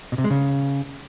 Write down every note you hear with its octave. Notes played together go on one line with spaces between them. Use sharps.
B2
C3
G#3
C#3